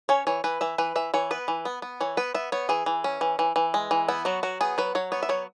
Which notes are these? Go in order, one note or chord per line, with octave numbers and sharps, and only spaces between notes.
C#4 C#5
E3 C#5
E3 B4
E3 E5
E3 B4
E3 E5
E3 C#5
B3 B4
E3
B3
B3
E3 C#5
B3 B4
B3 E5
B3 C#5
E3 G#4
E3
C#4
E3
E3
E3
G#3
E3
B3 E4
F#3 F#4
F#3 F#4
B3 G#4
F#3 B4
F#3 C#5
B3 C#5
E5
F#3 C#5